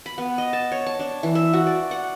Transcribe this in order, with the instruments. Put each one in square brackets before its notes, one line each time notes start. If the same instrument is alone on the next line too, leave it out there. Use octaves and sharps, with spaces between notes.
[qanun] B5
B3
D#5
A5
C#5
A5
D4
E3
E5
F#4
D5
F#5